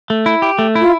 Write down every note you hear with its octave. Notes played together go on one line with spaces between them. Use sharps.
A3
E4
G4
A3
E4
F4